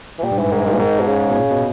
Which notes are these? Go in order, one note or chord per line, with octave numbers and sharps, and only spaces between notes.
E3
A#2 G3
G2
G#2 E3
G#2 D#3
E3
G2 D#3
A#2 E3
G#2 D#3
B2
C#3
B2
A#2
B2